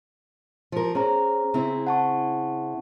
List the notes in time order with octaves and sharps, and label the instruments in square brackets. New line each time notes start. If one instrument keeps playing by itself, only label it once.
[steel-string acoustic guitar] F3 A#4
[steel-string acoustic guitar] C#4 [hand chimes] G#4 C5 A#5
[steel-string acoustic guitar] C#3 C4 E4
[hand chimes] F#5 A5 C#6